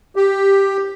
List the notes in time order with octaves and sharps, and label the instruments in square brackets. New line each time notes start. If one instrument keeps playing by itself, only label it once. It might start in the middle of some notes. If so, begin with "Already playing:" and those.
[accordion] G4